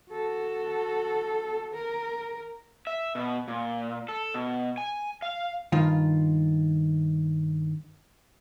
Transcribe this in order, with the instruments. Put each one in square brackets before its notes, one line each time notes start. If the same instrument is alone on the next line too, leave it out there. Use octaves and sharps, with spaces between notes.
[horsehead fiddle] F#4 A4
A#4
[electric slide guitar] E5
B2
A#2
A4
B2
G#5
F5
[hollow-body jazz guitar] G2 D#3 F4